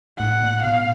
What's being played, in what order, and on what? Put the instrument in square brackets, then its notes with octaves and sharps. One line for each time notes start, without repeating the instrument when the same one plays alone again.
[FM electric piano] A2 [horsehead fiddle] F#5
[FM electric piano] A#2
[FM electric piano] B2 [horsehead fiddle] F5